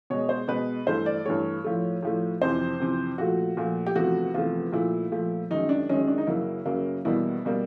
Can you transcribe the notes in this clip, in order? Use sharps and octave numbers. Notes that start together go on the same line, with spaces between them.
B2 G#3 C#5
C5
B2 G#3 B4
G2 E3 A3 C5
D5
G2 E3 A3 C#5
A2 F3 A3
A2 F3 A3
F2 C3 E3 C5
F2 C3 E3
A#2 F3 A3 F#4
A#2 F3 A3
G4
E2 C3 F3 A3 F#4
E2 C3 F3 A3 F4
A#2 F3 A3 E4
A#2 F3 A3
F#2 D#3 G#3 D#4
D4
F#2 D#3 G#3 C#4
D4
D#4
F#2 C#3 F#3 A#3 E4
F#2 C#3 F#3 A#3
E2 B2 G3 A#3 E4
B2 G3 A#3